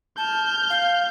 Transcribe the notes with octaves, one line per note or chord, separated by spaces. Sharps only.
A5 F6 G6
F5